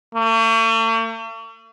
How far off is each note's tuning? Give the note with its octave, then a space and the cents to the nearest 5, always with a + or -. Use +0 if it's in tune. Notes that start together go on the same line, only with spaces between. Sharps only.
A3 +45